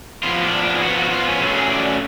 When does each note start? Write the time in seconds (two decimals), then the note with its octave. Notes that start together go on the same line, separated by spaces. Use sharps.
0.23 F3 B3 F4
0.43 D4
0.63 D4
0.75 G#4
0.82 F3 B3 F#4
0.97 F#4
1.11 F4
1.26 C#4
1.41 C#3 F#3 A3 C#4 F4
1.55 G#4
1.70 D5